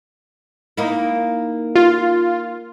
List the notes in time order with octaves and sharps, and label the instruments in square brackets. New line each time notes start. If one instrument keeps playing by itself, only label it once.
[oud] A#3 D#4 E4
[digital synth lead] F4